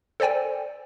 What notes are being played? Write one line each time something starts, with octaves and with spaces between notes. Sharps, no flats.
A4 C5 D5 G5 G#5